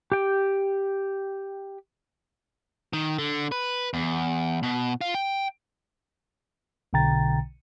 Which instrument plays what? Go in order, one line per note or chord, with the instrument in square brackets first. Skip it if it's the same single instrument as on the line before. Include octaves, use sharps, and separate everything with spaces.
[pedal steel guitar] G4 G5
[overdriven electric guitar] D#3
D3
B4
E2
B2
F4
G5
[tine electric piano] B1 B2 D3 G5 A#5 A6